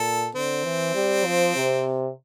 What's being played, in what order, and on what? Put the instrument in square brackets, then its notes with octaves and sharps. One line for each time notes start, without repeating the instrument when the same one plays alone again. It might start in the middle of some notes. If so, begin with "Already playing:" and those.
Already playing: [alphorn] A#2 [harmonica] A4
[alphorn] D3 [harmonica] C4
[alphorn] E3
G3
F3
C3